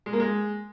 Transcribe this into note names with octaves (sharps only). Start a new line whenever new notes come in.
G#3
A#3
G#3